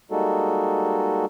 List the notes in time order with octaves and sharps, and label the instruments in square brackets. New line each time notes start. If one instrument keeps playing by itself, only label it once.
[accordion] G3 G#3 A#3 D#4 F#4 A4